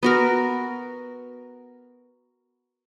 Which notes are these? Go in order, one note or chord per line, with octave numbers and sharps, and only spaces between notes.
B3 F#4 A#4